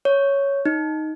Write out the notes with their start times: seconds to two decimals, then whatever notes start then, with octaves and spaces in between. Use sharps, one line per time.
0.05 C#5
0.65 D#4